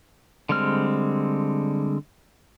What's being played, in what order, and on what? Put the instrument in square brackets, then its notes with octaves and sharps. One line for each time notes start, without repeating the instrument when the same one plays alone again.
[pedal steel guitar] D3 G3 G#3 C4 F6